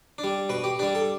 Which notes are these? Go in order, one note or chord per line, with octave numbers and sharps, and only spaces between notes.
D4
G3
B2 B4
G4
G3 D4 G4
A4